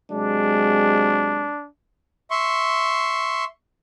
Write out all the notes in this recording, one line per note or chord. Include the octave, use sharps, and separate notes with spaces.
C3 F#3 G#3 D4
E5 C6 C#6